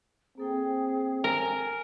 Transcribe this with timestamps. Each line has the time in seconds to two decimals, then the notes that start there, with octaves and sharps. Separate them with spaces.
0.38 A#3 C4 G#4 A4 G5
1.24 A#4 G#5